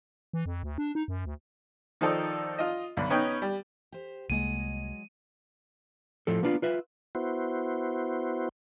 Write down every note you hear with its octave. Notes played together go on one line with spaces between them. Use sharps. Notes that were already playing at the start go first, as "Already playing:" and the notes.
E3
F2
D2
D4
D#4
F#2
D2
D#3 F3 D#4 A4 D5
F4 D#5
B1 D3 B5
B3 C#4 D#4 G5 B5
G3
G4 C5
C2 F#3 G#3 A#3 D#5 D#7
A2 F3 A4
A#3 B3 D4 F4
F4 B4 E5
B3 E4 F#4 C5